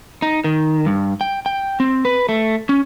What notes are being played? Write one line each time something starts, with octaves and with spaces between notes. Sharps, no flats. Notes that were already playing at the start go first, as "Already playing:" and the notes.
D#4
D#3
G2
G5
G5
C4
B4
A3
C#4